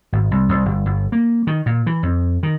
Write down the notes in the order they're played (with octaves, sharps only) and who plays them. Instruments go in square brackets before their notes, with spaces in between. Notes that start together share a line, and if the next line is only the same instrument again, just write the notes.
[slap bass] G#1
C2
C2
G1
G1
A#3
D#3
A#2
E3
F2
D#3